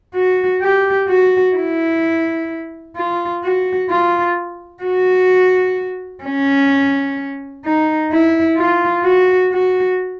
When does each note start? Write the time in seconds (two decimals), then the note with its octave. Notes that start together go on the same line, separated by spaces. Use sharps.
0.15 F#4
0.62 G4
1.09 F#4
1.56 E4
2.97 F4
3.44 F#4
3.90 F4
4.83 F#4
6.24 C#4
7.65 D#4
8.12 E4
8.58 F4
9.05 F#4
9.53 F#4